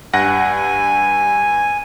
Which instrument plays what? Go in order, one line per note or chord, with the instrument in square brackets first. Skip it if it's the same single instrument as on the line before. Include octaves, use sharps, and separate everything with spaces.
[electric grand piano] G2 F#5 A#6 [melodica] G#5